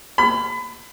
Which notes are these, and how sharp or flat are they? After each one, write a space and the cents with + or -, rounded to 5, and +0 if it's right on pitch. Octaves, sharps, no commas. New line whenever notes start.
B5 +30